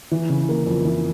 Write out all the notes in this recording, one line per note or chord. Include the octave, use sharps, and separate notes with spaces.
E3
C#3
A#3
F2
E3